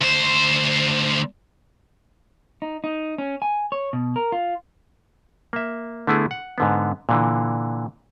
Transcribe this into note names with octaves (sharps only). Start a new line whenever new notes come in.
D2 C5
D#4
D#4
C#4
G#5
C#5
B2
A#4
F4
A#3 E5
D3 A3 B3 E4 G#4
F#5
G#2 D3 B3
A#2 D3 E3